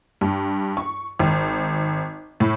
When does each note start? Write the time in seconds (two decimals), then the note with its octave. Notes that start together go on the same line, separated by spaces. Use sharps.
0.21 G2
0.77 C#6
1.19 G#1
2.40 A2